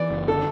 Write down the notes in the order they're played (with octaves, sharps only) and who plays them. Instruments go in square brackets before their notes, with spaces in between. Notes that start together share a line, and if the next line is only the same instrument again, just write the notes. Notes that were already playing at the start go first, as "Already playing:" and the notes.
Already playing: [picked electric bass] E3 [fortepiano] D5
[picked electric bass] F#1
[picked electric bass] D3 [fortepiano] A4